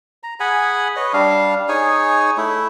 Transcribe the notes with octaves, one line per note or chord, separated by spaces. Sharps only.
A#5
G#4 F#5 G#5 B5
B4 C#5 D#5
G3 D4 F5
D#4 G#4 C#5 G#5
A3 E4